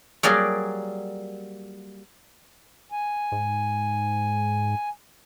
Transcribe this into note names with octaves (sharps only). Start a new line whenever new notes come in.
F#3 G3 A#3 G#4 D5
G#5
G#2